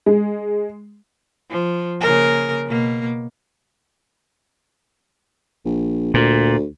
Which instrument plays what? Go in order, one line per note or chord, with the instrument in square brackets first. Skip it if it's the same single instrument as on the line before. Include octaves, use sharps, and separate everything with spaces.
[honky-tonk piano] G#3
[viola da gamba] F3
C#3 A#3 A#4
B2 A#3
[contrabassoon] A#1
[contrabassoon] D2 [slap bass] A#2